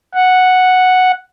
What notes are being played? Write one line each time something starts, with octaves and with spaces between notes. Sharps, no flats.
F#5